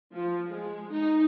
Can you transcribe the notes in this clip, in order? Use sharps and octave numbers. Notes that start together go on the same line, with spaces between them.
F3
G#3
D#4